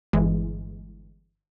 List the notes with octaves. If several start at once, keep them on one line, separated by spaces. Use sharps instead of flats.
G1 E3 G#3